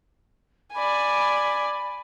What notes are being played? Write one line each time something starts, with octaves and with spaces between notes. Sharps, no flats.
D5 G#5 B5